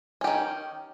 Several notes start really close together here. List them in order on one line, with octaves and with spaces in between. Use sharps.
C#4 G4 D#3